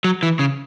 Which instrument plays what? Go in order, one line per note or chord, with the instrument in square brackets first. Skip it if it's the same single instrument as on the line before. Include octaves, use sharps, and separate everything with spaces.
[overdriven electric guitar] F#3
E3
C#3